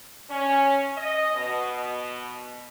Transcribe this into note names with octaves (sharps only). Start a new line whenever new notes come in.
C#4
D#5
B2